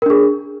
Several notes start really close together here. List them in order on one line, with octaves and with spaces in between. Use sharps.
A#4 D4 G#4